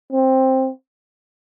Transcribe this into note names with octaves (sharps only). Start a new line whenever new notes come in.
C4